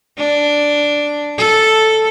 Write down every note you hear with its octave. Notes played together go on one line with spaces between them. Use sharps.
D4
A4